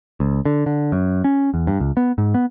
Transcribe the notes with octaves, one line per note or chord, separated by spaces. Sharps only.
C#2
D3
D3
F#2
C#4
E2
G2
C#2
B3
G#2
B3